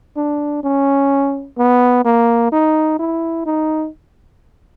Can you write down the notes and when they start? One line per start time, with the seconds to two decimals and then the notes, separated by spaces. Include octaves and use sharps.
0.17 D4
0.64 C#4
1.58 B3
2.05 A#3
2.52 D#4
2.99 E4
3.46 D#4